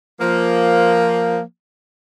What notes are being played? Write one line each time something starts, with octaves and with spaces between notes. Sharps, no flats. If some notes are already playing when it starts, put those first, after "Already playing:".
F3 A#3